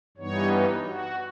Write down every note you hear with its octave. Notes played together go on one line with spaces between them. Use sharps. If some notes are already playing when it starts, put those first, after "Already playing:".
G2 E3 G3 B3 D#4 C#5
F#4